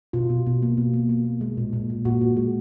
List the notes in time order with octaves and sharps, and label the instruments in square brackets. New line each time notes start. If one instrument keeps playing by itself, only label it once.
[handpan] B2 F4
B2
B2
A#3
B2
A#3
A#3
A#3
G#3
A#2
A#2
A#2
A#2 F#4
A#2
G#3